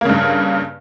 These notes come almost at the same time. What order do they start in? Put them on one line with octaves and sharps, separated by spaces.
A#3 C#3 G2